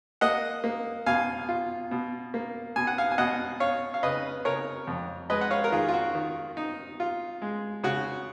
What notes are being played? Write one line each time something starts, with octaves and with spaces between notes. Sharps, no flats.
A#3 D#5 F#5
A#3
B2 F5 G#5
F4
B2
A#3
B2 G#5
F#5
F5 G#5
G#5
B2 D#5 F#5
C#4 C#5 F5
F5
C#3 B4 D#5
C#3 A#4 C#5
F2
G#3 B4 D#5
F#5
C#5 F5
A#4
D#3 F4 G#4
F4
F#4
D#3
D#4
F4
G#3
C#3 F#4